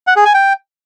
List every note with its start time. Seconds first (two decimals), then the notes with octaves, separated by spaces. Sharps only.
0.07 F#5
0.16 G#4
0.25 G#5
0.34 G5